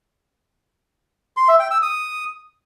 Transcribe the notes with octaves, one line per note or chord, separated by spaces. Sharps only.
C6
E5
G5
E6
D#6